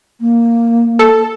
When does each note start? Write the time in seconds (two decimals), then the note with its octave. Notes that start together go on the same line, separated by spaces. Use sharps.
0.20 A#3
0.99 A4